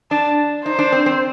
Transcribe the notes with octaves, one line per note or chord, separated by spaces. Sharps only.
D4 A5
D#4 C5
D4
C4
C4